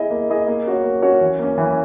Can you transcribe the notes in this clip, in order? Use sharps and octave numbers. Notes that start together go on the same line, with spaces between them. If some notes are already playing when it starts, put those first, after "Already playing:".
Already playing: E4 G#4 D#5
A#3
E4 G#4 D#5
A#3
C#4 F#4 C#5
A#3
C#4 F#4 C#5
E3
A#3 C#4
E3